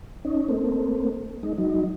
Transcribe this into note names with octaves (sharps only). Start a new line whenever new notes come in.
C#4 D#4
A3 A#3 C4
G#3 D#4
F#3 D#4